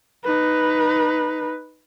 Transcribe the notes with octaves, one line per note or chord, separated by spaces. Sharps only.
D#4 B4